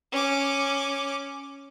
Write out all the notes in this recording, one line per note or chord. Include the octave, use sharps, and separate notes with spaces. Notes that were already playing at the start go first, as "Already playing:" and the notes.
C#4 D6